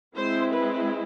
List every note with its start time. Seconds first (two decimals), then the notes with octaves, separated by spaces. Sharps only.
0.15 G#3 C4 E4 C5
0.53 B4